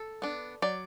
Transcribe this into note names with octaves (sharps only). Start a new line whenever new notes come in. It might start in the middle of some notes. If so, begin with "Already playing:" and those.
Already playing: A4
B3 D4
F#3 D5